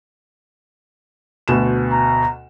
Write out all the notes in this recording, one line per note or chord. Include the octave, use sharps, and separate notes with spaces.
D2 B2 E7
A#5